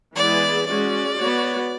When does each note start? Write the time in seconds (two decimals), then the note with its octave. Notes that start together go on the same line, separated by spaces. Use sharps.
0.16 E3 G#3 B3 E4 G#4 D5
0.66 G#3 C#4 F#4 D5
1.17 B3 F#4 C#5